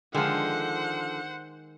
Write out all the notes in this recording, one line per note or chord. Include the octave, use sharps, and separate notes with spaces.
D3 D#3 F3 G#3 C5 F#5